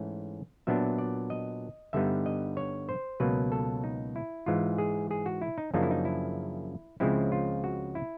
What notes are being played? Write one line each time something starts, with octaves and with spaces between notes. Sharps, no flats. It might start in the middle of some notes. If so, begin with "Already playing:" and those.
Already playing: G#2 E3 A3 C#4
A#2 F#3 B3 D4 E5
D5
D#5
G2 D3 G3 B3 D#4 E5
D#5
C#5
C5
C#2 B2 F#3 A#3 B4
A4
D#4
E4
G#2 E3 G#3 F4
G#4
G#4
F#4
E4
D#4
F#2 C#3 F3 A#3 D4 D#4
E4
D#4
E4
C#2 C#3 F3 G#3 C4 E4
F4
F#4
E4